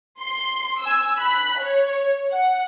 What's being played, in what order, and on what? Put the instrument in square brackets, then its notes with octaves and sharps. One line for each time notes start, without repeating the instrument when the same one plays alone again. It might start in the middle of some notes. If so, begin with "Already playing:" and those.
[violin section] C6
G#5 E6
B5 F#6
C#5
F#5